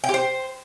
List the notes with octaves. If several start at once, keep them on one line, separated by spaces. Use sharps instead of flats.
G5
G4
C5